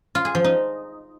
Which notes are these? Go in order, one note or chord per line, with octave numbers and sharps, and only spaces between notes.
F4
G#4
F3
D#4